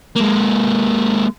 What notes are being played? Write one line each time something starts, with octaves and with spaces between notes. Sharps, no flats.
G#3 A#3